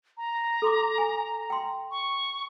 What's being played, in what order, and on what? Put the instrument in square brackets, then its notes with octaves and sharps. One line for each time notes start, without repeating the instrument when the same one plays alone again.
[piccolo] A#5
[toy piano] A4 C6 D6
G#5
G5 C6
[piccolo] C#6